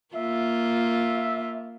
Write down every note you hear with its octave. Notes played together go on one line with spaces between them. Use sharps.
A#3 F4 E5